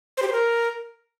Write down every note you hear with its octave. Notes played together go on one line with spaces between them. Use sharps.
C5
G4
C5
A#4